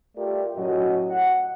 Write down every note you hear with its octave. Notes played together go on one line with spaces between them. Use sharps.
A3 F4 G4 A#4 D5
F#2 A2 F#3 C#4 F#4 D#5
F#5